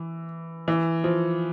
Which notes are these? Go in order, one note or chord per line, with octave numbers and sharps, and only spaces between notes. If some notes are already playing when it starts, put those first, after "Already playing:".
Already playing: E3
E3
F3